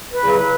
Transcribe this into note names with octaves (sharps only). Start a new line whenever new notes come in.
B4
E2 C#3 F#3